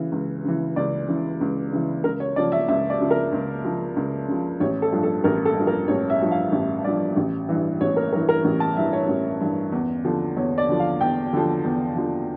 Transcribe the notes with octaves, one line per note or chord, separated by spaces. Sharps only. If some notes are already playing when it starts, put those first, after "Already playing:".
Already playing: C#3 E3
C#2
C#3 E3
C#2 D5
C#3 E3
C#2
C#3 E3
C#2 A#4
C#5
C#3 F3 D5
E5
C#2 E5
D5
C#3 F3
A#4
C#2
C#3 F3
C#2
C#3 F3
A1 C#5
A4
G2 F3
A4
A1 A#4
A4
G2 F3
A#4
A1 C#5
E5
G2 F3
F5
A1
G2 F3 D5
A1
G2 E3
A1 C#5
A#4
G2 E3 A#4
A#4
A1
A5
G2 E3 E5
C#5
A1
G2 E3
E2
D3 F3
E2 C#5
D5
D3 F3
F5
E2 G5
D3 F3
E2
D3 F3